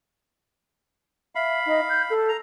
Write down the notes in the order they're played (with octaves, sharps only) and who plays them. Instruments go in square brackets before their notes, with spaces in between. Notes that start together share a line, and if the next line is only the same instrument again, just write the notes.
[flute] E5 [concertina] F5 B5
[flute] D#4
G6
A4
[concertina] A#5